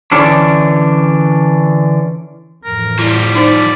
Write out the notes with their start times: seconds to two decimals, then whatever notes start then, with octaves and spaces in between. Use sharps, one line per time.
0.12 D3 E3 C#4 D4
2.64 F2 A2 E3 A#4
2.99 F3 G3 E4
3.35 D#4 C5 D5